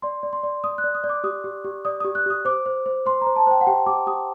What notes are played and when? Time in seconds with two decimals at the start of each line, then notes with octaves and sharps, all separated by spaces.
0.02 D5 C6
0.23 D5
0.33 C6
0.43 D5
0.64 D5 D#6
0.78 F#6
0.84 D5
0.95 D#6
1.04 D5
1.09 D6
1.24 G4 D#6
1.44 G4
1.65 G4
1.85 D5 D#6
2.00 G4 D#6
2.15 F#6
2.26 G4 D#6
2.45 C5 D6
2.66 C5
2.86 C5
3.06 C5 C6
3.21 A#5
3.27 C5
3.36 A5
3.47 C5 G5
3.61 F#5
3.67 G4 G5
3.86 G4 D6
4.07 G4 D#6